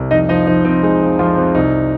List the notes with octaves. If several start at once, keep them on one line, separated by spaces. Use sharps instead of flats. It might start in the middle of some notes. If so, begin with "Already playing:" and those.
Already playing: C2
F2 D#4 D#5
F3 D#4 D#5
F3 D#4
F2 C4
G#3 D#4
F3
F2 F3 F4
F2
C2 D#4